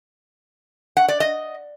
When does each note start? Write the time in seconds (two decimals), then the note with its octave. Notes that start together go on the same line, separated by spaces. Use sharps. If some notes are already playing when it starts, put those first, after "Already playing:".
0.97 F#5
1.08 D5
1.20 D#5